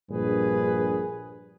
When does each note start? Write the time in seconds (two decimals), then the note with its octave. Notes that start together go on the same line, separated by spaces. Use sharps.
0.10 A#1 G2 G#4 B4